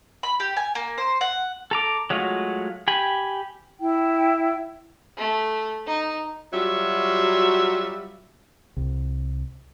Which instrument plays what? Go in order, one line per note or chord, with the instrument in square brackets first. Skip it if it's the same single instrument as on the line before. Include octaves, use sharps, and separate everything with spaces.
[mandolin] B5
G4
G#5
A#3
C5
F#5
[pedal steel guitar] A4 A#5 D6
F#3 G#3 A3 F4 F#4
G4 G#5 B5
[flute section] E4 G5
[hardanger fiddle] A3
D#4
[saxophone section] F#3 G3 F4 F#4 E5
[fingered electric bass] C2